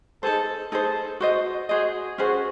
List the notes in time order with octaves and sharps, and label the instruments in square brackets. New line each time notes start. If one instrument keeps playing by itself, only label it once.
[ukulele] D#4 G#4 C5 [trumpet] A4
[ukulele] D#4 G#4 C5 [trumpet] A4
[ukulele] F#4 C5 D#5
[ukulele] F#4 C5 D#5 [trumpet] G#4
[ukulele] C#4 G#4 C5 [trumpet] F#4